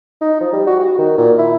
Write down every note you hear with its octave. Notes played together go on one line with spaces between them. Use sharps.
D#4
F3
G3
F#4
F#4
D#3
A#2
E4